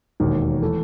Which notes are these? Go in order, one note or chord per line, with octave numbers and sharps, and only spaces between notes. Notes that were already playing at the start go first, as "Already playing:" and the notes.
E1 D#2 D#3
E3 A3